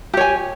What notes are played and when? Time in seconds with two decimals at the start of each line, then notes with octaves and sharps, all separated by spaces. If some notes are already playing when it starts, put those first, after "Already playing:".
0.14 G4
0.17 C#5
0.21 G#5